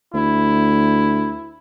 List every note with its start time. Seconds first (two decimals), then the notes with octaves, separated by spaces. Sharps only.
0.14 D2 E4